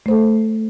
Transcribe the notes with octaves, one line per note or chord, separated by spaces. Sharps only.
A3 A4 C5